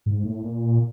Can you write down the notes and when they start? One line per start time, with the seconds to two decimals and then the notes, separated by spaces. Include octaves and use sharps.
0.06 G#2
0.25 A2
0.44 A#2